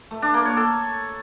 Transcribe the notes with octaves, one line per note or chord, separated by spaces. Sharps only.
A3
D4
A#3
C#5
A4